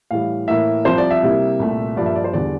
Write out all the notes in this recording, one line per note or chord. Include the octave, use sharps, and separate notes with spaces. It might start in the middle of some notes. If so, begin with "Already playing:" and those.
A2 E3 G3 F5
A2 E3 A#3 E5
C2 C3 F3 C5
D5
E5
C3 G3 A#3 E4
C2 A#2 A3
G2 F3 A#3 D5
E5
D5
C5
E2 D3 G3 D5